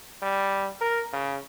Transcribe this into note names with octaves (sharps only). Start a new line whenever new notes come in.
G3
A#4
C#3